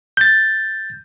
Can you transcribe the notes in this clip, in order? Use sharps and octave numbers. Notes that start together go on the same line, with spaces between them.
G6 A6